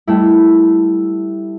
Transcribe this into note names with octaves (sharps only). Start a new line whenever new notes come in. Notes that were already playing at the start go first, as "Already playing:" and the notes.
G3 A3 E4